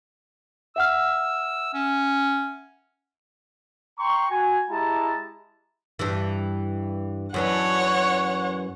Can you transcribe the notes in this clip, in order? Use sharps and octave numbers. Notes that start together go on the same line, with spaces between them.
E5 F#5 E6 F6
C#4
G5 A#5 C6 C#6
F#4 G#5
G#3 E4 G4 A5 A#5
G2 E3
F#2 E3 D4 C#5 F#5